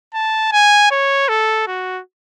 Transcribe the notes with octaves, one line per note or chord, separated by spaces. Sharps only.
A5
G#5
C#5
A4
F#4